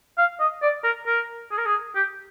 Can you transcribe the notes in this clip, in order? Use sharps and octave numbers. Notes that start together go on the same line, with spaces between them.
F5
D#5
D5
A#4
A#4
G#4
A#4
G#4
G4